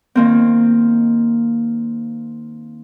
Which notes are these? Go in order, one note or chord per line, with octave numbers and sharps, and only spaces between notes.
D#3 A#3 C4